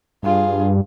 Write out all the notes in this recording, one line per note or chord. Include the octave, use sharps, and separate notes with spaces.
G2 F4 G#4